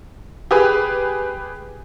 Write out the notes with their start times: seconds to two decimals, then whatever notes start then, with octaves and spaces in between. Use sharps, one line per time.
0.51 G4 G#4 B4